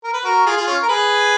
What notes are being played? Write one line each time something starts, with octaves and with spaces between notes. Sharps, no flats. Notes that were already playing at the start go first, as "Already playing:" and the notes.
A#4
B4
F#4 A#4
F4 G#4
F4 G#4
C#4 F4
A#4
G#4 B4